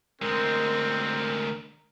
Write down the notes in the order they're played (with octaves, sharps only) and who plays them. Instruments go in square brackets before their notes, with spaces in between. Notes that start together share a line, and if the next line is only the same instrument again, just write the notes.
[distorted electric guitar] D2 G#3 [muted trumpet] C4 [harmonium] A#4